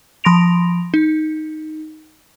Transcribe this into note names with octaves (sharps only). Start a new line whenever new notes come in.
F3 B5 C6 A#6 D7 F7
D#4